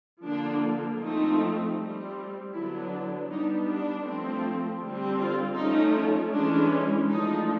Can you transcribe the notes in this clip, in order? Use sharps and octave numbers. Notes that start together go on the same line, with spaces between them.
D3 F3 A#3 D4
F3 A3 C4 D#4
G3 C4
D3 F#3 B3 D4 E4
G3 B3 D4 D#4
D4
F3 A3 C4
D3 G3 C4
F4
F3 A3 C#4 D#4
E3 G#3 C#4 D4
F3 A3 D4 D#4